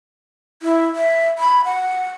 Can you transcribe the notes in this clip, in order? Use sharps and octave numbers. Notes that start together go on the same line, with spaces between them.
E4
E5
B5
F#5